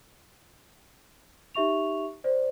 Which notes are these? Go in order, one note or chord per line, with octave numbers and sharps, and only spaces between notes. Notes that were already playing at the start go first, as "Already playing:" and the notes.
D#4 G4 E5 C#6 F7
C5 D5